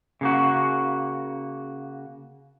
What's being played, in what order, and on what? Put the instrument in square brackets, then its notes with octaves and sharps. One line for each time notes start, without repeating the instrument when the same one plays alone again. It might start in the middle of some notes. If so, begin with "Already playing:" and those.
[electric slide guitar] C#3 A#3 F#4